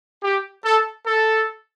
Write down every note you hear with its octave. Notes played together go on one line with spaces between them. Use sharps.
G4
A4
A4